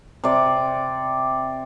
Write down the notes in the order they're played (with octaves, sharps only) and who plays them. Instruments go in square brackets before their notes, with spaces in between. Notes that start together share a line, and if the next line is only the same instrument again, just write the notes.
[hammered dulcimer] C3 D5